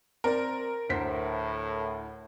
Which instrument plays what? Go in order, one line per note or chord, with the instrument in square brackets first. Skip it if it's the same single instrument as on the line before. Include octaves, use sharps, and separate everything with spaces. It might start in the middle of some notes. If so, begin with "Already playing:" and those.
[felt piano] C4 D5 [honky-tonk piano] A#4
[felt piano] D2 C5 B6 [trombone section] A2